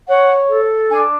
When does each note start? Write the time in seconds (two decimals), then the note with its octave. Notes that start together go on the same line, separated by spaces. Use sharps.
0.07 C#5 F#5
0.47 A4
0.89 D4 G#5